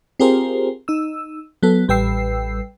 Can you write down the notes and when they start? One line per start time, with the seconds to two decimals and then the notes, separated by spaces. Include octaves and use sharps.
0.20 C4 F4 G4 G#4 A#4 C5
0.88 D#4 E6
1.63 F#3 B3 A4
1.88 A1 G3 B4 G5 E6 C7